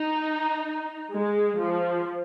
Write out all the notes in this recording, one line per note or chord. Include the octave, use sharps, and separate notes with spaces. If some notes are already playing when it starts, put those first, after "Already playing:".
Already playing: D#4
G#3
F3